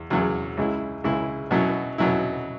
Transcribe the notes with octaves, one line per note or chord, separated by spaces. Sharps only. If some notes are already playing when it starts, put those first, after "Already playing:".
Already playing: E2
E2 C#3 F#3
C#2 C#3 G#3 E4
C#2 C#3 G#3 E4
B2 F#3 C#4 E4
B2 F#3 C#4 E4